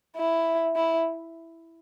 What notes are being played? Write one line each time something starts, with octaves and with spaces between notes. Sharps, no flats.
E4
E4